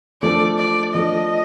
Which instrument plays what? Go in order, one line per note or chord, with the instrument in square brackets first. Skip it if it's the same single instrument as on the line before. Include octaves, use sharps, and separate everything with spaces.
[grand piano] F3 A3 D4 A4 [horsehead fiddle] D5
[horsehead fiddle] D5
[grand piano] F3 A3 D4 A4 [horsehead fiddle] D#5